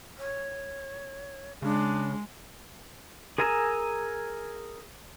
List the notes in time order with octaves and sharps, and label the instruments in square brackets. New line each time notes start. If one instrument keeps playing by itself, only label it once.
[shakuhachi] C#5
[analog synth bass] C#3 [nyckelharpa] G#3 [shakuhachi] D4
[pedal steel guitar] G#4 A#4 G#5 A#5 E6